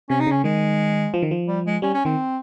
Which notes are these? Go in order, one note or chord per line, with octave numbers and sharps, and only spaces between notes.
C3 C#4
D#4
C#3 C#4
D#3 G#3
F3
D#3
F3
G3
G#3
G3 C#4
C#4
D#3 C4